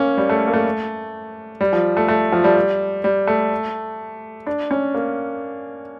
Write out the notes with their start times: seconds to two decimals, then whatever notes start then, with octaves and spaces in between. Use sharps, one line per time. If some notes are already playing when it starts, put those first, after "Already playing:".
Already playing: A#3 C#4
0.17 G3
0.29 A3
0.48 A#3
0.54 A3
1.61 G3
1.73 F3
1.97 A3
2.08 A3
2.32 F3
2.44 G3
3.04 G3
3.27 A3
4.47 D4
4.71 C#4
4.95 A#3